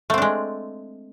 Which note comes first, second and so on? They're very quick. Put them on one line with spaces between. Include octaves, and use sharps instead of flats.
A3 C4 D4 G#3